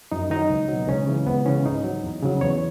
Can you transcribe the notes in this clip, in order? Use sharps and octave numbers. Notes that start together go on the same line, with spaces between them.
F#2 D#4
D#3 F#3 D#4
C#2
B2 F#3
C#2 C#4
C#3 E3
C#2 B3
C#3 E3 C#4
G#2 D#4
F#3
E2
C#3 F#3
E2 C#5